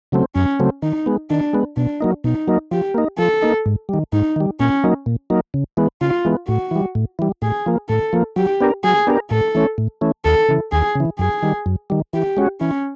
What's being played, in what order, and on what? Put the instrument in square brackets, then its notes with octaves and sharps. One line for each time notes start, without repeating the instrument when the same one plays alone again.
[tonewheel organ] C#3 F#3 A3 C4
[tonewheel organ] F#2 [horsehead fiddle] C#4
[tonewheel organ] C#3 F#3 A3 C4
[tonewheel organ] D#3 [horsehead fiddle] D#4
[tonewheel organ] G#3 B3
[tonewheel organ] D#3 [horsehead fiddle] D4
[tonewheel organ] G#3 B3
[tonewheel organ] B2 [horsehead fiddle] D4
[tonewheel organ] F#3 A#3 D#4
[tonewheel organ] B2 [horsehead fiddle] D#4
[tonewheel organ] F#3 A#3 D#4
[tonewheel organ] F3 [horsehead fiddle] G4
[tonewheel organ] A#3 D#4
[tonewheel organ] F3 [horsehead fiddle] A4
[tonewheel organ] A#3 D#4
G#2
D#3 G3
[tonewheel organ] G#2 [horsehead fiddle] D#4
[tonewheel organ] D#3 G3
[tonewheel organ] A#2 [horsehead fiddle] C#4
[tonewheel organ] F#3 A#3 D#4
A#2
F#3 A#3 D#4
C#3
E3 G#3 B3
[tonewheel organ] C#3 [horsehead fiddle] F4
[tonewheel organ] E3 G#3 B3
[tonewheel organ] A2 [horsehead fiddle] F#4
[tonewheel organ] E3 G3
A2
E3 G3
[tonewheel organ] A2 [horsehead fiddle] G#4
[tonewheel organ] F3 A#3
[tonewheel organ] A2 [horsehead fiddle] A4
[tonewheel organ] F3 A#3
[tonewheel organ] F#3 [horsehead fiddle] G4
[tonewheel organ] B3 D4 G4 A#4
[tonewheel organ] F#3 [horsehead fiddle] G#4
[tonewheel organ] B3 D4 G4 A#4
[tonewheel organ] A2 [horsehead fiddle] A4
[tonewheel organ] E3 A3 C#4
A2
E3 A3 C#4
[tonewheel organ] D#2 [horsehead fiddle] A4
[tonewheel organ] C#3 E3
[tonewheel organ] D#2 [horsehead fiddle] G#4
[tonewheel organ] C#3 E3
[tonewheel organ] F#2 [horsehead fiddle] G#4
[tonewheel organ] D#3 G3
F#2
D#3 G3
[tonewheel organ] E3 [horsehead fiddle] G4
[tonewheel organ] G#3 C#4 F#4
[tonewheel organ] E3 [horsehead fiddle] C#4